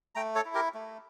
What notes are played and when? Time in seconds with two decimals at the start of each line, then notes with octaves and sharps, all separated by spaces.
0.15 A3 G5 A#5
0.35 A4 C#5
0.45 E4
0.54 G4 A#4
0.74 A3